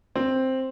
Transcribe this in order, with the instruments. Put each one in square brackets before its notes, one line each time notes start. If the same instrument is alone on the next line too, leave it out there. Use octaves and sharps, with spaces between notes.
[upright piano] C4